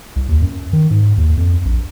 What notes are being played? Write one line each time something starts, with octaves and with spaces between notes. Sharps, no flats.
C2
D#2
F#2
D#3
G#2
D#2
F2
A#1